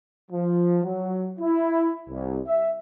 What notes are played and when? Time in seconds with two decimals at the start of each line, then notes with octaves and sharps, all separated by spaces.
0.31 F3
0.84 F#3
1.40 E4
2.09 C2
2.47 E5